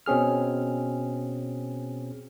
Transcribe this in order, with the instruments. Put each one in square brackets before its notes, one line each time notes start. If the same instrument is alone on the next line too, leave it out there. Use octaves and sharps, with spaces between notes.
[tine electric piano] B2 C4 C#4 G#4 F6